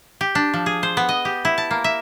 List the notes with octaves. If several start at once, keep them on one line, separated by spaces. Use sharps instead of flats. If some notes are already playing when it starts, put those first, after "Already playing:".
G4
D4
F3
G#4
C5
B3
D#5
G4
E4
A5
A#3
E5